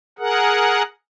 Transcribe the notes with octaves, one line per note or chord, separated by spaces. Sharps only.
G#4 A#4 F#5